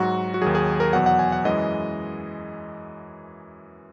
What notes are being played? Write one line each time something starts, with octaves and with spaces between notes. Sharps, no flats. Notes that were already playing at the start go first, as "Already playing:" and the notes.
Already playing: G#2 F#3 F#4
F#4
D#2 D#3 F#3 G#4
G#4
A#4
E2 B2 F#3 F#5
F#5
G#5
F#5
F#2 E3 G#3 D#5